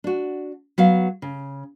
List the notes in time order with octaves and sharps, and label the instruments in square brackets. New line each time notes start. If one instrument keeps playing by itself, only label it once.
[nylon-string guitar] D4 F#4
F#3 B3 F5
C#3